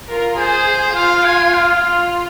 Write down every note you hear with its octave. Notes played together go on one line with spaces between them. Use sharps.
F4 A#4
G#4 C5
F4 F5
G#5
F5
F4